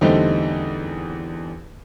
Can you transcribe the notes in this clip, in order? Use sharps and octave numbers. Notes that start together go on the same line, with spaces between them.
E2 D3 G3 A3 C4 D#4